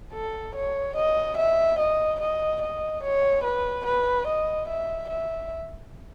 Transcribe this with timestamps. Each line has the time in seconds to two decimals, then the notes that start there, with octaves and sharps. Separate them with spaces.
0.13 A4
0.55 C#5
0.96 D#5
1.37 E5
1.79 D#5
2.20 D#5
2.61 D#5
3.03 C#5
3.44 B4
3.86 B4
4.27 D#5
4.68 E5
5.09 E5